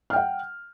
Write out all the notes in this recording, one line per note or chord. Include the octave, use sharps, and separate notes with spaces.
F#5 G5 F6